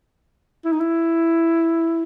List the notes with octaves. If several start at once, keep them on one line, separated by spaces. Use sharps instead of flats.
E4
D#4
E4